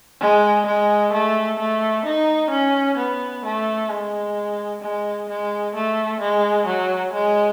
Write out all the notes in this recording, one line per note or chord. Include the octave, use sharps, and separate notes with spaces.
G#3
G#3
A3
A3
D#4
C#4
B3
A3
G#3
G#3
G#3
A3
G#3
F#3
G#3